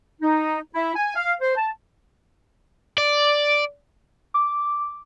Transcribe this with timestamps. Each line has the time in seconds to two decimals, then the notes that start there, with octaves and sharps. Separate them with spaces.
0.22 D#4
0.75 E4
0.96 G#5
1.16 F5
1.41 C5
1.57 A5
2.98 D5
4.34 D6